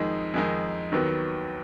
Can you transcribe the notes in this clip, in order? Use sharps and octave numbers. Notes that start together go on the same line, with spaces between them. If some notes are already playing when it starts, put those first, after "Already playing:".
Already playing: F2 D#3 G#3 D#4
F2 D#3 G#3 D#4
D#2 D#3 F#3 B3